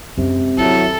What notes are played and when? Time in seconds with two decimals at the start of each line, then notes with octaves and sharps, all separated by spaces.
0.18 F#2 C3 G#3
0.58 D#3 F#3 E4 A4